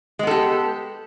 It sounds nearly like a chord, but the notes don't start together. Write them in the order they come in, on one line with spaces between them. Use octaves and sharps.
G#3 B3 A4 G4